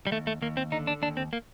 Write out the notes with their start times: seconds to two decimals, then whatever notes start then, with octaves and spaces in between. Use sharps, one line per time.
0.07 G3
0.11 D#2 A3
0.27 A3
0.42 D#2 A#3
0.57 C4
0.72 D3 D#4
0.87 D4
1.02 D#2 D4
1.17 C4
1.33 A#3